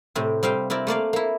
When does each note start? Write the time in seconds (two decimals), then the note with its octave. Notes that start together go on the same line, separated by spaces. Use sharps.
0.16 A2 C3 C4
0.43 G3 C4 F5 G5
0.70 C4 E4 A#4 D5
0.87 A3 A#3 D5 F5
1.13 A#3 E4